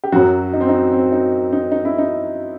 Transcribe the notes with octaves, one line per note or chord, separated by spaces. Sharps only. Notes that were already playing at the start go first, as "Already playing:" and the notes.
G4
F#2 F#3 F#4
D#4
C4
D#4
C4
D#4
D#4
D#4
E4
D#4